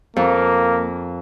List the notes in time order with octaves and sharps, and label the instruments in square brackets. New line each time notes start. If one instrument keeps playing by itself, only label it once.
[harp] F2 [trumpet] A#3